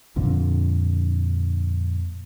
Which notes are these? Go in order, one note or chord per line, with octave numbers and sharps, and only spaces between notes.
F2 A#2 D3